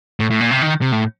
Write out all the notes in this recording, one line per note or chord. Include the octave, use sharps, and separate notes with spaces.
A2
A2
A#2
C3
D#3
C3
A2